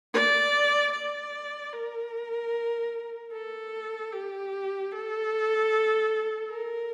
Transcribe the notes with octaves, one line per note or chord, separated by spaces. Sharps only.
D5
D5
A#4
A4
G4
A4
A#4